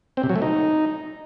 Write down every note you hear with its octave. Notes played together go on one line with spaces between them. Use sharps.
C4
C3
F#3
A3
D#4